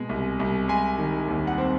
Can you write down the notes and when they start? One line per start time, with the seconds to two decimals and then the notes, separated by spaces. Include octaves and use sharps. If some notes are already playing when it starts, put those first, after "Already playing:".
Already playing: B2 G#3
0.09 C2
0.39 C2
0.68 G#3 G#5
0.98 D#3
1.28 D#2
1.47 F#5
1.58 C4